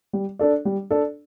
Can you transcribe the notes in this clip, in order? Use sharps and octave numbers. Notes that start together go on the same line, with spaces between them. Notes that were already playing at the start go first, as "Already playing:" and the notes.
G3
D4 A4 D5
G3
D4 A4 D5